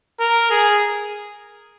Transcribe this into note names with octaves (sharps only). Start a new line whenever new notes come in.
A#4
G#4